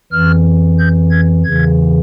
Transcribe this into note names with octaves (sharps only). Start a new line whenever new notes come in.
F2 E3 F6
G6
G#6
E2 C#3 E3 G#6